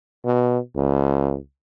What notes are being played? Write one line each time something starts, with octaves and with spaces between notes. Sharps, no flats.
B2
C#2